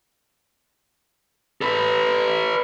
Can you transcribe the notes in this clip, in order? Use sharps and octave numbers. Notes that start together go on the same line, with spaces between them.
A4 B4